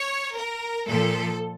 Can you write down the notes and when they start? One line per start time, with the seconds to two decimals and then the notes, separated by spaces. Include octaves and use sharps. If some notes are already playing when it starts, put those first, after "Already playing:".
Already playing: C#5
0.36 A#4
0.88 A#2 F3 A4